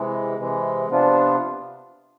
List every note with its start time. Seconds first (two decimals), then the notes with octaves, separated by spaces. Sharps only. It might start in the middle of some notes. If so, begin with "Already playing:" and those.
Already playing: C3 E3 G#3
0.38 C3 E3 G#3
0.88 C3 F3 B3 D4 F4